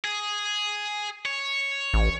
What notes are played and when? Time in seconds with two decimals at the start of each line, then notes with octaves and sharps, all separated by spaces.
0.04 G#4
1.25 C#5
1.94 A1